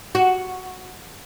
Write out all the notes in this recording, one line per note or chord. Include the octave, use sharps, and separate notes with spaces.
F#4